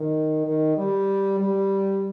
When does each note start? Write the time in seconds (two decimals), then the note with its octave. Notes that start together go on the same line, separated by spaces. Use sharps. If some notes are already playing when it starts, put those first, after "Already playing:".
Already playing: D#3
0.47 D#3
0.77 G3
1.40 G3